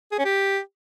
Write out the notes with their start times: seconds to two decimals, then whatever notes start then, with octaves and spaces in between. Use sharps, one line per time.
0.12 G#4
0.18 C#4
0.25 G4